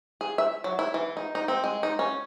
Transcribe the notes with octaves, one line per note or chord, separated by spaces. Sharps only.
G#4
E5
F#3
E4
E3
D#4
D#4
C4
G#3
D#4
C#4